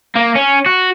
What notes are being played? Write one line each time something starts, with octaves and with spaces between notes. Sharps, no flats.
A#3
C#4
F#4